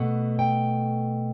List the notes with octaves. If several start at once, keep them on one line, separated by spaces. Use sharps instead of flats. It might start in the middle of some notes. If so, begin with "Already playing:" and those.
Already playing: B2 A3 F#5
G5